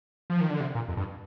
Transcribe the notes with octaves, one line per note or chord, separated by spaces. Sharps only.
F3
D#3
D3
C3
A#2
F2
G2